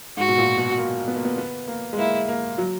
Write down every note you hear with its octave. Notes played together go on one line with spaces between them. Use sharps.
G#2 F#4
B2
A#2
B2
A#3
B3
A#3
B3
B3
A#3
G#3
A#3 E4
A#3
F#3